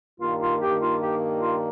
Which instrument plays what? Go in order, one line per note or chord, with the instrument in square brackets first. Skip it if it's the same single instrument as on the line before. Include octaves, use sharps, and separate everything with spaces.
[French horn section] G2 D#3 G3 A#3 [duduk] F4
[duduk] F4
G4
F4
G4
F4